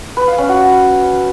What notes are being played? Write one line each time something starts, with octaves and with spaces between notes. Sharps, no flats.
B4
F5
C#4
F#4